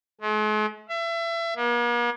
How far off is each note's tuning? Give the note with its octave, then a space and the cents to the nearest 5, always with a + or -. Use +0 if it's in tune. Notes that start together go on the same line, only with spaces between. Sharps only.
G#3 +45
E5 +30
A#3 +45